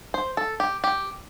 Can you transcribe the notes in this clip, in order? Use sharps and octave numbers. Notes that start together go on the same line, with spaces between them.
C5
A4
G4
G4